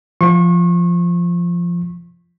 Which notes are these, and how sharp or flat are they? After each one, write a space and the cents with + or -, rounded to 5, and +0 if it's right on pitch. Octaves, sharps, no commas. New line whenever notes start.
F3 -10 C#6 -35